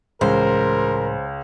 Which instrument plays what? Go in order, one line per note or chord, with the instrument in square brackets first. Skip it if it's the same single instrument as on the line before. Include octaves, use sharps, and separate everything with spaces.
[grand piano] C#2 [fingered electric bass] A2 E3 [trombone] A#4 [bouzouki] C5